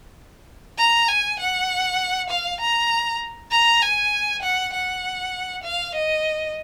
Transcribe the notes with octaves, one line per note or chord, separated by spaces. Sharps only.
A#5
G#5
F#5
F5
A#5
A#5
G#5
F#5
F#5
F5
D#5